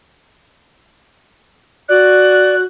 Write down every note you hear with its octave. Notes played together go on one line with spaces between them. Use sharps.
F#4 D5 F#6